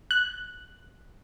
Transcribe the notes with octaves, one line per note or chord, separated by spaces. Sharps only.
F#6